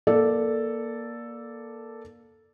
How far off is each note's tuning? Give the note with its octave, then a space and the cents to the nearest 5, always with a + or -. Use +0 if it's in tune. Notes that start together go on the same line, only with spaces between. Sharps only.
A#3 +20 A4 +0 D5 +0